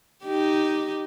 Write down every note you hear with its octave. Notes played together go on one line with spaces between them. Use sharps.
D#4 G4